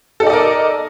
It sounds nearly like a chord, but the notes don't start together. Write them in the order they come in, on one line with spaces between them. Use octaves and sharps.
A4 D#4 D5 D#5 A#4